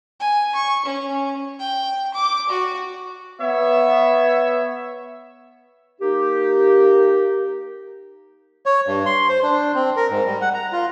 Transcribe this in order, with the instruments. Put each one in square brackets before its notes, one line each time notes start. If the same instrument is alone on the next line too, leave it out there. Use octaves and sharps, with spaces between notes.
[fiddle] G#5
C#6
C#4
G5
D6
F#4
[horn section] B3 C#5 E5
[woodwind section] A#3 D#4 G4
[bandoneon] C#5
G2
C6
C5
D4
C4
A#4
G#2
G3
F#5
A#5
F4